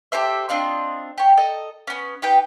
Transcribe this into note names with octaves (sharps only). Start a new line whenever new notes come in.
G4 A4 C5 E5
C4 D4 F4 D#5
G4 C#5
A4 D#5 A#5
B3 C#4
D#4 G4 B4 G5